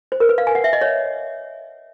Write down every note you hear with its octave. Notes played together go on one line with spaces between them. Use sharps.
C5
A#4
B4
F5
G#5
F#5
E5
D#5
C#5